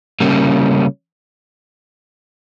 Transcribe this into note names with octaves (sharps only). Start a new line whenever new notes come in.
C#3 G3 A#3 C#4